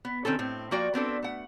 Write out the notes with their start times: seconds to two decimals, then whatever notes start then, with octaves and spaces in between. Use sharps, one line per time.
0.05 B3
0.25 D#3 C4 C#4 A4
0.39 A2 C4
0.71 F3 A#3 F#4 D5 G5
0.94 B3 C4 D4 A4
1.23 A3 F#5